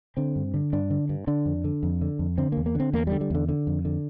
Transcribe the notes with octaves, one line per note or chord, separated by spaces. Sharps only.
D3 C4
G2
D3
G2 D4
D3
G2
D3 D4
F2
D3
F2
D3
F2
D3 C4
E2 A#3
A#3
D3 C4
E2 A#3
D3 G3
G3
E2 D3
D3
F2
D3